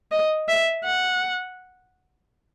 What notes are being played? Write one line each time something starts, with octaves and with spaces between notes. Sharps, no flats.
D#5
E5
F#5